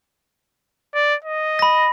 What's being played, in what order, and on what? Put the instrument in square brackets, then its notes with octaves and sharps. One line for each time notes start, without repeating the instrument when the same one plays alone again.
[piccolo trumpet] D5
D#5
[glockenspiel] B5 A#6